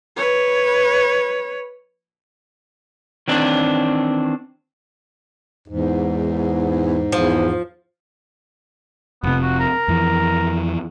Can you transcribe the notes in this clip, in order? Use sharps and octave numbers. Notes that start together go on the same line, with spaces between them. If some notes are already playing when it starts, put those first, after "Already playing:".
B4 C#5
D#3 E3 C4 D4
E2 G#2
E2 F3
F1 C3 B3
F#4
A#4
F2 E3